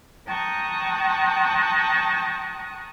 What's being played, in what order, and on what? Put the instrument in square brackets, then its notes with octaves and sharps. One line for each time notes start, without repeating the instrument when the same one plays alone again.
[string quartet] G5 A5 A#5 C#6 D#6 F#6